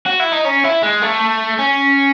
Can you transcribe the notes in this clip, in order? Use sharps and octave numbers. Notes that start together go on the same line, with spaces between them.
F#4
E4
D#4
C#4
E4
G#3
A3
C#4